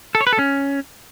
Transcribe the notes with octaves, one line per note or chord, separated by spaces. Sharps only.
A4
C#5
B4
A4
C#4